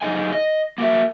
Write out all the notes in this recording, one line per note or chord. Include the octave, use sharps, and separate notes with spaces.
F#2 C#3 D#4 G#4 D#5 G#5
D#5
A#3 F#4 A#4 E5